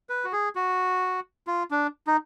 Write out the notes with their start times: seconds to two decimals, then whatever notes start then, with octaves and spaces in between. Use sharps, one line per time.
0.09 B4
0.24 F#4
0.33 G#4
0.55 F#4
1.47 F4
1.71 D4
2.07 D#4